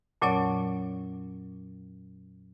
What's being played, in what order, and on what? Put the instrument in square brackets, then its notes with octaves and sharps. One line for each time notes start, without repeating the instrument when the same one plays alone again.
[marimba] F2 A#2 F#3 C#4 C#5 D5